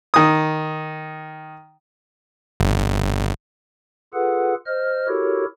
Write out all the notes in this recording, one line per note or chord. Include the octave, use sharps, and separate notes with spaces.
D#3 D#6
G1
F4 G#4 A4 B4 F#5
C5 D#5 F6
E4 F#4 G4 A4 A#4 C#5